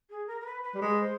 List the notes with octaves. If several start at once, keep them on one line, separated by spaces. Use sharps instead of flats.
G#4
A#4
A#4
B4
B4
G3
G#3 B4
C5